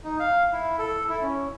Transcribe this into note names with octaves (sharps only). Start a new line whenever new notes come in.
D#4
F5
E4
A4
E4
C#4